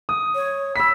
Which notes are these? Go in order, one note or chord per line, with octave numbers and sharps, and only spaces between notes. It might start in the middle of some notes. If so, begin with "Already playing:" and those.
D#6
C#5
B5 E6 B6